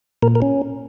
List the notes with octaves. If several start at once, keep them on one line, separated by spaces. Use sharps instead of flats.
A#2 A#4
A#4
C#4